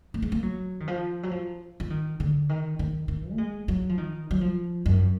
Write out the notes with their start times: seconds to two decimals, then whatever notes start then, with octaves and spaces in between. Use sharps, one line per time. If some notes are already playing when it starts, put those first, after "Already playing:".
0.14 A#3
0.22 G#3
0.32 A#3
0.43 F#3
0.80 D#3
0.87 F3
1.23 F#3
1.31 F3
1.80 F3
1.90 D#3
2.20 D3
2.49 D#3
2.79 D#3
3.08 D#3
3.33 A#3
3.38 G#3
3.68 F#3
3.89 F3
3.98 D#3
4.31 F#3
4.41 F3
4.86 F#2